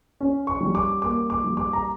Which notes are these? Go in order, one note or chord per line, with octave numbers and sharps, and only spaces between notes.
C#4
C#6
G3
D6
A#3 D6
D6
G3
D6
A#5